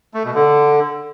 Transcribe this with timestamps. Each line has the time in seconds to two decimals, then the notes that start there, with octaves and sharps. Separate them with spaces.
0.14 A3
0.24 B2
0.34 D3